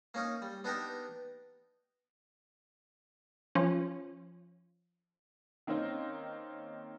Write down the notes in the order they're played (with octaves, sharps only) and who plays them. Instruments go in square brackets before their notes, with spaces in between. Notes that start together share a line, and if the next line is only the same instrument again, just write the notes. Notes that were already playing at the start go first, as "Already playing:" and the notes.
[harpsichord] A#3 C#4 D#4
G3
B3 D4 D#4 G4 A#4
[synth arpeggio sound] F3 C#4
[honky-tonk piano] D#3 A#3 C4 C#4 D#4